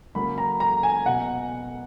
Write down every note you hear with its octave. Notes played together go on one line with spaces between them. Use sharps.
C#3 F#3 A#3 C#4 B5
A#5
A#5
G#5
B2 F#5